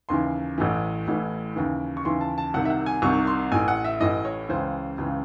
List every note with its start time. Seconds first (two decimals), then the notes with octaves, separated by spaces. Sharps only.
0.09 D#2 C#3 E3 C6
0.58 A1 A2 E3
1.08 A1 A2 E3
1.56 D#2 C#3 E3
1.97 C#6
2.05 D#2 C#3 E3 C6
2.21 A5
2.38 A5
2.54 C2 C3 D#3 F#5
2.65 E5
2.70 F#5
2.86 G#5
3.02 C2 C3 D#3 C#6
3.27 C6
3.52 A1 A2 E3 G#5
3.68 F#5
3.84 E5
4.00 A1 A2 E3 D#5
4.25 C#5
4.49 C#2 C#3 E3 C5
4.98 C#2 C#3 E3